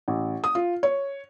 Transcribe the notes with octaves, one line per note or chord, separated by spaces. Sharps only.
A1
D#6
F4
C#5